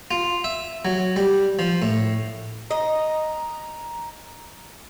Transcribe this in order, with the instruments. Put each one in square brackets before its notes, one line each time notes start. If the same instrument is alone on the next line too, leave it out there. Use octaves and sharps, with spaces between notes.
[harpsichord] F4
E5
F#3
G3
F3
A2
[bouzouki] D#5 [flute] A#5